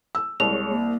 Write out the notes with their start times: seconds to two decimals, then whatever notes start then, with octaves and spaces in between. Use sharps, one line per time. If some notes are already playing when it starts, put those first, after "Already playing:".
0.15 E6
0.40 C2 G#3 C#5 F7
0.70 A#3